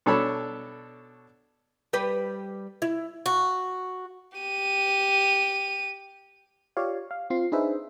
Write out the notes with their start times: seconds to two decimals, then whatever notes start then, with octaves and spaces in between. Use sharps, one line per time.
0.06 B2 D4 A4 C#5 A5 B5
1.93 G3 G4 B4
2.82 E4
3.26 F#4
4.38 G4 D#7
6.77 F4 G4 C#5 D5 F5
7.11 F5
7.30 C4 F4 C7
7.52 D4 D#4 G#4 B4 C5 E5